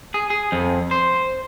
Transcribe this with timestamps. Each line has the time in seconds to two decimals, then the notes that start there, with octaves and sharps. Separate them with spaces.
0.14 G#4
0.30 G#4
0.52 F2
0.91 C5